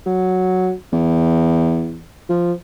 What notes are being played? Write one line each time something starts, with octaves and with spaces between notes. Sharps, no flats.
F#3
E2
F3